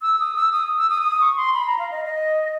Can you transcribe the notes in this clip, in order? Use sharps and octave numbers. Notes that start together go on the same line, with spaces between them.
E6
D#6
E6
D#6
E6
D#6
D#6
C#6
C6
B5
A#5
F5
D#5
D#5